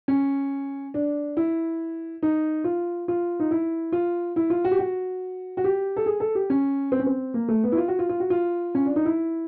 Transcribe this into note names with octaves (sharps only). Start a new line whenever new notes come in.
C#4
D4
E4
D#4
F4
F4
D#4
E4
F4
E4
F4
F#4
G4
F#4
F#4
G4
A4
G#4
A4
G4
C#4
C4
C#4
C4
A#3
A3
B3
E4
F4
F#4
F4
F4
F#4
F4
C#4
D4
D#4
E4